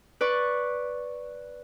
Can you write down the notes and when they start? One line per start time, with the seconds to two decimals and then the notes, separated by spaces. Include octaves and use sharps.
0.21 B4 D5 C#6